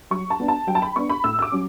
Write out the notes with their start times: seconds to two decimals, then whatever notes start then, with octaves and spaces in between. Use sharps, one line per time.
0.11 F#3 C#6
0.30 A5
0.40 B3 D4
0.48 A5
0.67 F#3 G5
0.75 A5
0.82 B5
0.96 B3 D4 C#6
1.09 B5
1.24 A2 E6
1.39 E6
1.42 D6
1.52 F#3 C#4